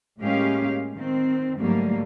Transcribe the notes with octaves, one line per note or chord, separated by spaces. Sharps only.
A2 G#3 A#3 C#4 G4 F5
D#3 C4
G#2 D3 F#3 G3 A3 A#3